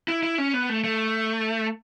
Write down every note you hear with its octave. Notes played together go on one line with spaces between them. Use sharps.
E4
E4
C#4
B3
A3
A3